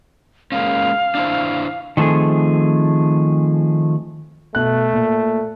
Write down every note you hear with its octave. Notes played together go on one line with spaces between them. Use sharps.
G#3 A#3 C#4 F5
D4 E4 C5
D#3 F3 A3 C4 G#4
B2 A3 F#6
A#2